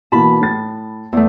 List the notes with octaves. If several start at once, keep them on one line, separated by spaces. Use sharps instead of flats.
B2 E3 A#3 A5 B5
A2 A6
E2 A3